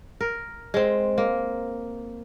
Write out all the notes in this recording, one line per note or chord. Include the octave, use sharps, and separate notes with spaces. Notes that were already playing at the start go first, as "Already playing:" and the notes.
A#4
G#3 C4
A#3